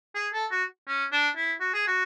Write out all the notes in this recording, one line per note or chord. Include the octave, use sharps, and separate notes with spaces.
G#4
A4
F#4
C#4
D4
E4
F#4
G#4
F#4